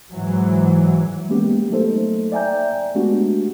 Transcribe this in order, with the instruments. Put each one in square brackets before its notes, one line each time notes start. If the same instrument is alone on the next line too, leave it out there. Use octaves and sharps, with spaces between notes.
[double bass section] G#2 E3 F#3
[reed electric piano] G#3 A#3 B3 C#4 G4
F#3 A3 A#3 D#4 A4 C5
D5 E5 G5 G#5 A#5 G6
G#3 A3 B3 D4 F#4 G4